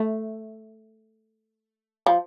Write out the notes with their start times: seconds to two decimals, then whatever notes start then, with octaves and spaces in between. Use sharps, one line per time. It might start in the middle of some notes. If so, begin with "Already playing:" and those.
Already playing: A3
2.06 F3